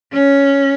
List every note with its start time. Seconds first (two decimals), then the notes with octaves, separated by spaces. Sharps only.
0.12 C#4